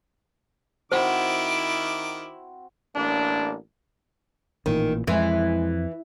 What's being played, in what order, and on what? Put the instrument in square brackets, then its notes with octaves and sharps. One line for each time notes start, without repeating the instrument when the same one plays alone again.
[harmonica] D#3 D6 [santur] C4 F#4 [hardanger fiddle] E4 [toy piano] C5
[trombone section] A1 A#3 D4
[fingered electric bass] A1 A#2 E3 [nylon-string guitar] D#3
[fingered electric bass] F2 [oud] E3 [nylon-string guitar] G#3